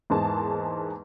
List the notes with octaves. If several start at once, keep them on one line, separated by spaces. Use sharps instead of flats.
E2 G#2 A#3 G#4 A5